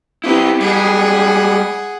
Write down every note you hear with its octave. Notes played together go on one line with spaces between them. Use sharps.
C4 E4 G4 B4
G3 G#3 G#4 F#5